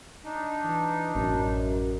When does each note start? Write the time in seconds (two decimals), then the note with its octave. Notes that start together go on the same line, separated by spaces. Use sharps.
0.24 D4 D#4
0.64 E3
1.15 A1 F#2